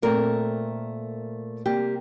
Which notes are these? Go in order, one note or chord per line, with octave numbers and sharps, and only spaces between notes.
A#2 A3 C4 A#4
C3 G3 A#3 G4